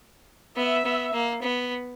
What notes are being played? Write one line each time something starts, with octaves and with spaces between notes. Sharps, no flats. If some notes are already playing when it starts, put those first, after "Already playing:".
B3 E5
B3
A#3
B3